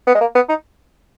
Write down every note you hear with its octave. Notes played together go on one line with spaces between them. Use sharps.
B3
G#3
A#3
B3
D#4